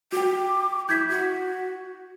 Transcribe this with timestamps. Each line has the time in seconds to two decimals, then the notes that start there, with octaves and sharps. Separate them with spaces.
0.12 F#4 G5 D6
0.89 E4 G6 G#6 B6
1.09 F#4